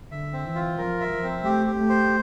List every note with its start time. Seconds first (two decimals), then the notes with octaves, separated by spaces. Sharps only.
0.11 D3 E5
0.33 C4
0.44 E3
0.55 F4
0.78 F3 A#4
1.01 E5
1.11 F3
1.23 C4
1.45 A3 G4
1.67 G4
1.78 A3
1.90 C5